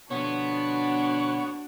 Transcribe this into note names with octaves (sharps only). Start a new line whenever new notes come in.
B2 D3 F3 B3 D4 F#4 C#5